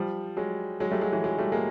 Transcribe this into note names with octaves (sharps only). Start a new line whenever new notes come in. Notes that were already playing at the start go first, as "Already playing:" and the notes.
Already playing: F3 G3
F#3 G#3
F#3 G#3
G3 A3
F#3 G#3
E3 F#3
F#3 G#3
G3 A3
G#3 A#3